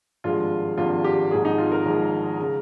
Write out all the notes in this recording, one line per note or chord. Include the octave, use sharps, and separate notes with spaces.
G#1 G2 F3 G#3 F4
G#1 G2 F3 G#3 F4
G4
G#1 G#2 F3 G#3 G#4
D#4
F4
A#4
G#1 G#2 F3 G#3
C#3 G#3